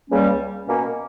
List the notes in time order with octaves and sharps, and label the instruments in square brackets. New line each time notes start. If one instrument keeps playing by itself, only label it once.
[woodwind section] C#2 C#3 G3 A#3 C#4
B2 A#3 C#4